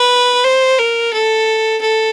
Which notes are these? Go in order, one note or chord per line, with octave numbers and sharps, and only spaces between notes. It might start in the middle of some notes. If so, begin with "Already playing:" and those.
Already playing: B4
C5
A#4
A4
A4